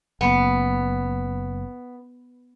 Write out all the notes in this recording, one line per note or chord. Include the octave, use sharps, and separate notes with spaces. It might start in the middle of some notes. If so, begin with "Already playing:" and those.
F#1 B3